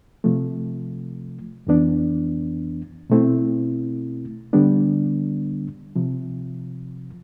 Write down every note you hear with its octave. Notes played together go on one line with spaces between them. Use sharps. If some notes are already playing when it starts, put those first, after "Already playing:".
C3 F3 A3
F2 E3 B3 D4
B2 A3 C4 E4
D3 G3 B3 D4
C3 F3